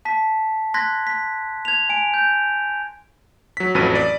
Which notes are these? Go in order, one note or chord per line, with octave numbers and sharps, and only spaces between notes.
A5 B6
C6 F#6 G#6 A#6 B6
B6
G#6 F7
G#5 D7
G6
F#3 B6
A1 F2 F#3 B4 D#7
D5